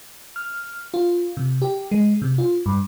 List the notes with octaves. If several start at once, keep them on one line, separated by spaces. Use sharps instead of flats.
F6
F4
C3
G4
G#3
C3
F4
G2